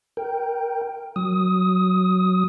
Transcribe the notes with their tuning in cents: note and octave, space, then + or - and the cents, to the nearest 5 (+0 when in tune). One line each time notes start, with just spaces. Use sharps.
A#4 +5 G5 +0
F#3 +0 D#6 +15